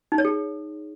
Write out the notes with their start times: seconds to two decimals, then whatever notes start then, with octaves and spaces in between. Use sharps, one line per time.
0.12 D#4
0.18 C#5
0.25 G#4